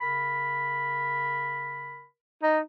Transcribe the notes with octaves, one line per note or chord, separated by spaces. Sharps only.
C#3 A#4 B5
D#4